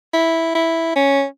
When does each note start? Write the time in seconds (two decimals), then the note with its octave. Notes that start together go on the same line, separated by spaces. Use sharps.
0.14 E4
0.55 E4
0.96 C#4